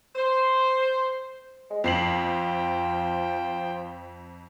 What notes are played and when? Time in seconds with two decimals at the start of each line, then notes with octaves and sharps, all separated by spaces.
0.16 C5
1.70 G#3
1.84 F2 F3 C5 G5 C7 F#7